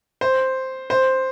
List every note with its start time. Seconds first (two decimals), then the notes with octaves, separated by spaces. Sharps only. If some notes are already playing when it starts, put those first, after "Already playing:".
0.21 C5
0.90 C5